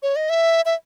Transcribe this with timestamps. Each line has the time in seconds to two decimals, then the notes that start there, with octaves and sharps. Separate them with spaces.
0.03 C#5
0.16 D#5
0.30 E5
0.66 E5